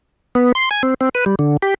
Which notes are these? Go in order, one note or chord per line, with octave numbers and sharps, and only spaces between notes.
B3
C6
G#5
C4
C4
B4
G3
D3
G4